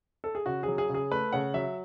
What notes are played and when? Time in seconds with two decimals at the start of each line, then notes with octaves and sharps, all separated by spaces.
0.24 A4
0.35 G#4
0.46 C#3 F#4
0.63 F#3 G#4
0.78 G#4
0.89 C#3
0.94 G#4
1.12 A3 B4
1.33 C#3 F#5
1.54 F#3 E5